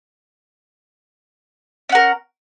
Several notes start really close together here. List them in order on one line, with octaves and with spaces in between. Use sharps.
C#4 F#5 A#4